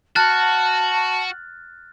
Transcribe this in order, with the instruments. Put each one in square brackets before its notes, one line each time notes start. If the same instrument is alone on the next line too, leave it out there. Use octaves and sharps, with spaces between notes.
[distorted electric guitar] F#4 [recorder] A5 [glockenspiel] F6 F#6 A6